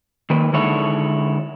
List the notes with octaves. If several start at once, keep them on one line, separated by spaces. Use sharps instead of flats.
D#3 A#3 B4
D3 G#3 D#4 E4 A4 C#5